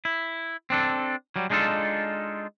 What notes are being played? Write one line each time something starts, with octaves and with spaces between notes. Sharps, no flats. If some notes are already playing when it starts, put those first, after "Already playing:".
E4
C4 D4 A4
F#3 G3
G#3 D4 D#4 F4 A4